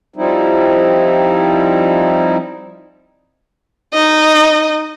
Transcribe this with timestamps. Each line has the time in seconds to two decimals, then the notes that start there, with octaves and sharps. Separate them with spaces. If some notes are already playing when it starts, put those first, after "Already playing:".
0.16 F3 G3 C4 D#4 E4
3.93 D#4 D#5